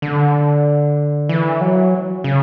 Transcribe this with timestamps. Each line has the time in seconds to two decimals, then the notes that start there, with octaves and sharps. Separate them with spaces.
0.02 D3
1.29 E3
1.61 F#3
2.24 C#3